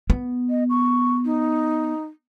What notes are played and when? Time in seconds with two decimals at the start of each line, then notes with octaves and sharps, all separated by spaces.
0.10 B3
0.50 D#5
0.70 C#6
1.25 D#4